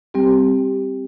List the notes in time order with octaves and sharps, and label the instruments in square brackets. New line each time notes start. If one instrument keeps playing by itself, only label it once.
[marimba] G3 C4 G4